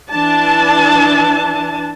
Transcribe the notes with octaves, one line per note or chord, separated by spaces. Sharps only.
E3 D4 A5